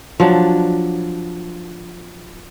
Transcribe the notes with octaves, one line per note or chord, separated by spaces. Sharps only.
F3 F#3 D4